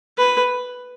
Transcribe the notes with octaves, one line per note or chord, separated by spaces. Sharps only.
B4